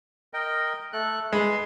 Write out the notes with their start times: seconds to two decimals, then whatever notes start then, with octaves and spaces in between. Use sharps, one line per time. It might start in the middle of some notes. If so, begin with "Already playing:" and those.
0.33 A#4 D#5 G5
0.93 A3 A4 F#6
1.33 G#3 B4